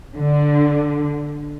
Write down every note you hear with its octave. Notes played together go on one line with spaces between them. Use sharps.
D3